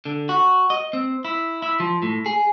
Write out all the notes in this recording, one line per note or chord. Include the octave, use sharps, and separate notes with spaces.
D3
F#4
D#5
C4
E4
E4
F3
A2
G#4